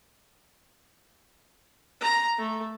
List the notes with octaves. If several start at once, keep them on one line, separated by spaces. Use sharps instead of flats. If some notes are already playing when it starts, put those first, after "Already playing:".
A#5
A3